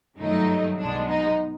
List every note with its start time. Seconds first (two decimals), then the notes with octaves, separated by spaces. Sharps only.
0.19 G1 F#2 D#3 F#3 A3 D#4
0.79 B1 B2 G#3 B3 D4
1.08 D#4